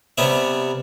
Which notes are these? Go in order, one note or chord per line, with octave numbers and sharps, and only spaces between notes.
C3 G3 B3 C#4 E5